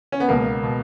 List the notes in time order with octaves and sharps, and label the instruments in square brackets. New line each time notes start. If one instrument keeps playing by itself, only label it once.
[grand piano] C#4
B3
C#2 B2 A#3
B2